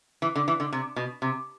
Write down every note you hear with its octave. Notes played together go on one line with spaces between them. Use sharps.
E3
D3
E3
D3
C3
B2
C3